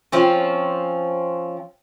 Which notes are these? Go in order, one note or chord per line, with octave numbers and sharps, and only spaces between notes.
F3 C4 C#4